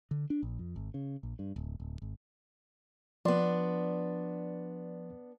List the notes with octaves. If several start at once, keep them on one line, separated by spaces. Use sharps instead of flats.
D3
D4
A#1
F2
G#1
C#3
A#1
G2
D1
D1
G#1
F3 B3 D4 D5 C6